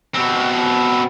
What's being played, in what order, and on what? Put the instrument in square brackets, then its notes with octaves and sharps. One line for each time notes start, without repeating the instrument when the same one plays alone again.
[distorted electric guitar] B2 C4